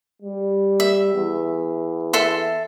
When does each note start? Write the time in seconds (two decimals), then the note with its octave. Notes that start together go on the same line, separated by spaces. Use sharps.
0.22 G3
0.80 E5
1.14 E2
2.13 A4 E5 C6